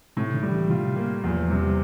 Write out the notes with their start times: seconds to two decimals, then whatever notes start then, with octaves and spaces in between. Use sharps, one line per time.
0.17 A2 C3
0.34 D3
0.43 G3
0.52 E3
0.70 C3 F4
0.96 A#3
1.24 E2 F3
1.39 F3
1.50 C3 G3